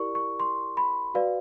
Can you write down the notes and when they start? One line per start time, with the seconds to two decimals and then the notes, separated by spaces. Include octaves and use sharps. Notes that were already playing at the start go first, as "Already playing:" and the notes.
Already playing: E4 G4 A#4 D5 C#6
0.15 C#6
0.40 C6
0.77 B5
1.14 F#4 B4 D5 F5